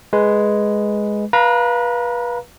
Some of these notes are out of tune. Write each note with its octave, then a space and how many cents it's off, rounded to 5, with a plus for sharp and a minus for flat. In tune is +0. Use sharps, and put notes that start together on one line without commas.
G#3 +0 B4 +0
B4 -25 F5 +0 A#5 +0